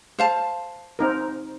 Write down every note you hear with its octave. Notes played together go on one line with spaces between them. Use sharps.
C5 F5 A5
C4 D#4 A#4